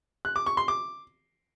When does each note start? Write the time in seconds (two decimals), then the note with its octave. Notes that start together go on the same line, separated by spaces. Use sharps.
0.25 F#6
0.36 D6
0.46 C#6
0.57 C6
0.68 D6